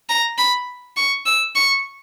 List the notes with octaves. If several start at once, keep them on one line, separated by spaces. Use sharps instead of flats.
A#5
B5
C#6
E6
C#6